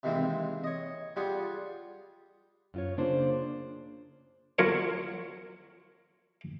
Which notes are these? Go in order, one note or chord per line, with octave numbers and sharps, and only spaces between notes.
C3 D#3 E3 G#3 A#3 C4
C#5 D#5
G3 F4 G4 G#4 F#5
F#2 F4 C#5
C#3 A#3 D4 C5
F#3 F4 A#4 C#5